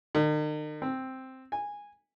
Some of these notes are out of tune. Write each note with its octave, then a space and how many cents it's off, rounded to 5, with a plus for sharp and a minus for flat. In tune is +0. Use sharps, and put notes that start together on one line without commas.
D#3 -40
C4 +0
G#5 -15